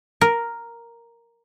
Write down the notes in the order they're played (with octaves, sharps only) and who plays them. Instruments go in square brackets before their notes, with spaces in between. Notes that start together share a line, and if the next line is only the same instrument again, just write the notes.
[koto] A#4